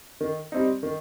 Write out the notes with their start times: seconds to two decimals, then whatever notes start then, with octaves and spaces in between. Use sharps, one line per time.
0.21 D#3
0.52 G3 C4 D#4
0.83 D#3